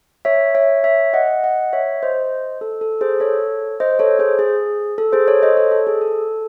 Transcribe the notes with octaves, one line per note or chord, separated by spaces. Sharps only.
C#5 E5
C#5 E5
C#5 E5
D#5 F#5
D#5 F#5
C#5 E5
C5 D#5
A4
A4
G#4 C5
A4 C#5
C5 D#5
A4 C#5
G#4 C5
G#4
A4
G#4 C5
A4 C#5
C5 D#5
A4 C#5
A4
G#4
A4